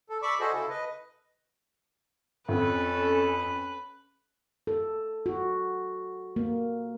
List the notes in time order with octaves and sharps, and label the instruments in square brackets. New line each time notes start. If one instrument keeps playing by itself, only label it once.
[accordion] A4
D5 B5 C#6 D6 E6
F#4 G#4 A4 C5 D#5
C#3 E4 A4
B4 D#5
[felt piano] F2 [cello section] C#4 A4 [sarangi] B4
[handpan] A4
F#4
A#3